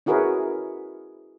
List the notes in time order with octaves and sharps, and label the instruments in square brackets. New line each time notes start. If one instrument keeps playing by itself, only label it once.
[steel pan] C#4 E4 F#4 G#4 A#4 B4